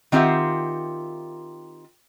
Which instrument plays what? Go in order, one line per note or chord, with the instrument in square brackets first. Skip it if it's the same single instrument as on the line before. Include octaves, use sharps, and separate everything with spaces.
[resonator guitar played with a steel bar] D#3 C4 F4 G4 E5 F#5